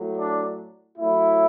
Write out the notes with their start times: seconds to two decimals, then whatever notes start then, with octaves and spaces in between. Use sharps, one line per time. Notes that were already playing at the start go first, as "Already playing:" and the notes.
Already playing: A2 F#3
0.18 D4
0.97 A2 F#3 E4